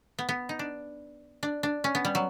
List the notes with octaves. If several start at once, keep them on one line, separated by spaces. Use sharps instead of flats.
B3
B3
D#4
D4
D4
D4
C#4
B3
G3
F#3